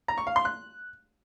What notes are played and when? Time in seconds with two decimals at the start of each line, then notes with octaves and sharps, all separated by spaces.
0.08 A#5
0.18 C#6
0.27 F5
0.36 C6
0.45 F#6